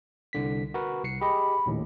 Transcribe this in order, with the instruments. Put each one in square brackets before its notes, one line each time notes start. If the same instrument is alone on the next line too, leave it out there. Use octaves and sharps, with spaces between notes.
[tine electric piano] C2 D3 B6
F#4 A#4 B4
C2 C7 C#7
[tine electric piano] G4 G#4 D#5 [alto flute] B5
[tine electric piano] A#1 D#2 A2